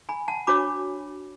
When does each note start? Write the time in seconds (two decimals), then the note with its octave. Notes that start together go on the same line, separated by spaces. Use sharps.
0.09 G#5 B5
0.28 F#5 A5
0.47 D4 F#4 C#5 B5 D6